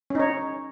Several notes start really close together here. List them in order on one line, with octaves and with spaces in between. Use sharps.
C#4 D#4 C#5